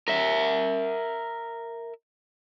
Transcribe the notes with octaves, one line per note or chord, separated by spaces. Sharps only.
A#4 E5